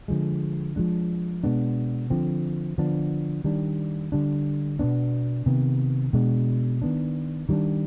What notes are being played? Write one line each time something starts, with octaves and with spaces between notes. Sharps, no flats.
D3 F3 G#3
F3 G#3 D4
B2 G#3 B3 D4
D3 F3 C4
D3 F3 B3 D4
D#3 G3 D4
D3 G3 D4
B2 B3 D4
C3 D#3 B3
B2 G#3 D4
D#3 B3 D4
D#3 G3 B3 D4